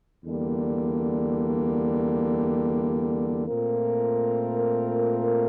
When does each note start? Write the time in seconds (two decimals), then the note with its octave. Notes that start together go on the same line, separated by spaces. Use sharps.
0.24 E2 D3 G3 A#3
3.47 A#2 A3 C4 F4 A#4